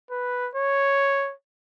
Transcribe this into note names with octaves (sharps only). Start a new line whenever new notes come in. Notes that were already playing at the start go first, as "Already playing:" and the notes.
B4
C#5